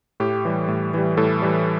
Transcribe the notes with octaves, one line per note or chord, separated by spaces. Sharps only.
A2 G4
E3 G3
A2
E3 G3
A2 A4
E3 G3